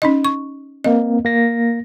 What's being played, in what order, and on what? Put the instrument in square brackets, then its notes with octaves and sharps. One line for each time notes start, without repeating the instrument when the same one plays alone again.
[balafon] C#4 D#4 D#5
C#6
[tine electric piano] A#3 C4 [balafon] D#5
[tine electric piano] A#3 A#6